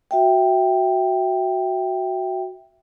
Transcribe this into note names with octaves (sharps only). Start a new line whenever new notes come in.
F#4 E5 G5